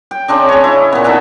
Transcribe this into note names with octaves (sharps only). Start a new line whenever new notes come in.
G5
C#3 C4 D4 D#5
G#4 C#5
E4
A#2 B3
D#4 A4 E5 F#5